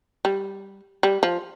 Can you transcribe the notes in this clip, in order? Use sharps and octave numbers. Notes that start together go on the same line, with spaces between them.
G3
G3
F3